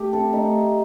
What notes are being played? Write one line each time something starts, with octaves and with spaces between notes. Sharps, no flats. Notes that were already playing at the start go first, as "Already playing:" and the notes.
Already playing: A3 G4
C4 A4
A3 D#4